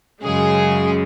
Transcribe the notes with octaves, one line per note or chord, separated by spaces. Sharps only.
F#2 C#3 G#3 G#4